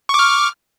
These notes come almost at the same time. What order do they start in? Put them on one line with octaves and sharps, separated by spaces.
C#6 D6 F6